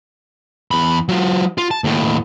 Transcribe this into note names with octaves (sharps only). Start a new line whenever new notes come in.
E2 B5
F#3 F4
F4
A5
D#2 A2